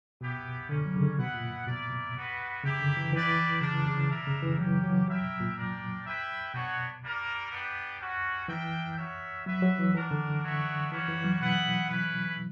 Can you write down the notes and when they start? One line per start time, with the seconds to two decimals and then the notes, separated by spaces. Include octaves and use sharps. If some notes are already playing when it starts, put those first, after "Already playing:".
0.21 B2 B3 E4 G4
0.69 D3 G3 A#3 C#4
0.86 F#3
0.96 C#3
1.02 D3
1.18 B2 B3 E4 B4 F#5
1.34 A#2
1.67 B2 A#3 E4 A#4 D5
2.16 G3 B3 F#4 B4
2.64 C#3 A#3 E4 G4
2.80 D3
2.97 E3
3.13 E3 E4 B4 D5 G5
3.61 C#3 G3 A#3 D4
3.85 C#3
4.10 B2 G3 A#3 D4 A#4 E5
4.27 C#3
4.42 E3
4.59 F#3 A#3 C#4 G4
4.84 F#3
5.08 F#3 E4 A#4 E5 G5
5.24 B2
5.40 A#2
5.56 D4 A#4 D5 G5
6.05 E4 B4 E5 G5
6.53 B2 B3 D4 F#4 C#5
7.02 G3 A#3 D4 A#4
7.51 B3 D4 G4
8.00 G3 C#4 F#4
8.48 E3 D4 A#4 E5 G5
8.97 F#4 A#4 C#5 E5
9.46 F#3 F#4 B4 E5
9.62 F#3
9.79 E3
9.94 E3 A#3 D4 F#4 A#4
10.11 D3
10.43 B3 D4 F#4 C#5 E5
10.92 E3 G3 A#3 C#4 F#4 C#5
11.08 E3
11.24 F#3
11.40 B2 B3 E4 B4 F#5
11.89 C#4 E4 B4